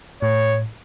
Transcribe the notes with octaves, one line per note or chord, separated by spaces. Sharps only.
A2 C#5